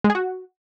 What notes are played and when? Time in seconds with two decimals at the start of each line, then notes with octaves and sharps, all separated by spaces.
0.04 G#3
0.10 G#4
0.15 F#4